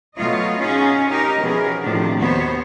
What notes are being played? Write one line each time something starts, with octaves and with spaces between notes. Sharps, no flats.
B2 F#3 A3 F4 C#5 D#5
C#4 D#4 F4 F#4 G#4
D#4 G4 A#4 D#5
B2 E3 F3 C#4 G#4 A#4
A2 C3 D#3 F3 D4
D#2 B3 F#4 C5 C#5